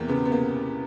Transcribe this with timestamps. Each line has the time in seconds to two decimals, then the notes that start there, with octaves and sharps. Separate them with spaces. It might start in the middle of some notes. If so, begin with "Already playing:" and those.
Already playing: E2 C3 E3 A#3
0.08 C#3 B3
0.25 B3
0.32 A#3